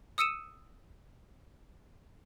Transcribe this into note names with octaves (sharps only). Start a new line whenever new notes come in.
D#6 E6 C#7 D#7 E7